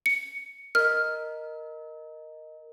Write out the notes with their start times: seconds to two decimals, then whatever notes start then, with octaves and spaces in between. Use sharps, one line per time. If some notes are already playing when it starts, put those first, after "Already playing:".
0.06 C#7
0.75 A#4 D#5 F6